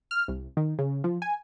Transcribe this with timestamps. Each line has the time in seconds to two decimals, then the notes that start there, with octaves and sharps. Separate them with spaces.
0.11 F6
0.28 C2
0.57 D#3
0.79 C#3
1.04 F3
1.22 G#5